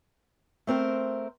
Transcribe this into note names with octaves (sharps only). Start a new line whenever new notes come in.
A3 C4 A#4 C5